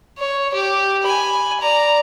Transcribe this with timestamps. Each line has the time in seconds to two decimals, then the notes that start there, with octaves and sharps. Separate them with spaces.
0.18 C#5
0.53 G4
1.02 G#5 B5
1.60 D5 A#5